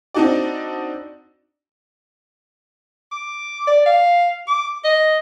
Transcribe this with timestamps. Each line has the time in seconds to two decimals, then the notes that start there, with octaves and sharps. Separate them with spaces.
0.14 C4 D4 D#4 F#4 D5
3.12 D6
3.67 D5
3.86 F5
4.48 D6
4.84 D#5